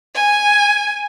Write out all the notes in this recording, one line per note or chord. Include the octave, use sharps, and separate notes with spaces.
G#5